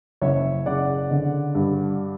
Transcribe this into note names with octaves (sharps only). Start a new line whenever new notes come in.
F#1 C#5 E5
C#3 D5 F#5
D3
G2